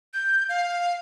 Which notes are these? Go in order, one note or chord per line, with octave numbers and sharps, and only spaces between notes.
G6
F5